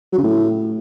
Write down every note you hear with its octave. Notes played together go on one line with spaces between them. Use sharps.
F#3
C#3
A2